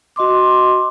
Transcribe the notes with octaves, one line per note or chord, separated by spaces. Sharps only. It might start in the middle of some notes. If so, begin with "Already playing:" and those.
F#4 D#5 C6 D6